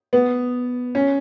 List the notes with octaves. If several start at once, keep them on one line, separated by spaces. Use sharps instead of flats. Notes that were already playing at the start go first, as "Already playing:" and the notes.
B3
C#4